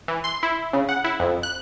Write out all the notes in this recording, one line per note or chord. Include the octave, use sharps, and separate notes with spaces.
E3
C6
E4
C#3
F#5
E4
F2
F#6